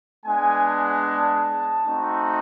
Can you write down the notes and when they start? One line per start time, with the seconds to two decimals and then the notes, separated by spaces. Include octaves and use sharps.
0.24 G#3 B3 D4 G#5
0.65 A5
1.86 A3 C4 D#4 F#4